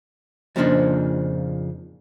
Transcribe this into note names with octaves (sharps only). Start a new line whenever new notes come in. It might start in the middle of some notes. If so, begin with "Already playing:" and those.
F2 A#2 C#3 F3 D4 D#4